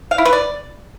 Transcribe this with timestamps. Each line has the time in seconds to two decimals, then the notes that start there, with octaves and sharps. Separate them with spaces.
0.11 F5
0.18 E4
0.25 B4
0.33 D5